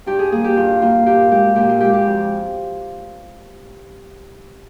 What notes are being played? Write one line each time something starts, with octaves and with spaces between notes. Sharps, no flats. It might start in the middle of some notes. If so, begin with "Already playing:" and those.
G2 G4
G#4
G3 A#3 G#4
G4
G2 F4
G3 A#3 F4
A#2 G4
G#3 G4
A#2 G4
F4
G#3 G4
G4
F2